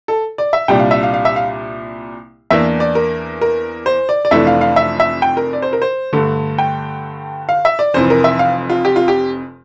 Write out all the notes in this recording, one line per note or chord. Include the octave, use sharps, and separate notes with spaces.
A4
D5
E5
C2 A#2 G3 D4 G5
F5
E5
F5
F5
E5
F5
E2 E3 A#3 D4 E5
D5
A#4
A#4
C5
D5
D5
F1 F2 E3 A3 D4 E5
F5
F5
E5
E5
G5
A#4
D5
C5
A#4
C5
G2 D3 A3
G5
F5
E5
D5
F1 F2 E3 C5
A#4
E5
F5
F4
G4
F4
G4